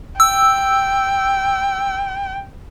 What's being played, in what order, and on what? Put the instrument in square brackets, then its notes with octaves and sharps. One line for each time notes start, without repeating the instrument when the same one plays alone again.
[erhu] G5 [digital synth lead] E6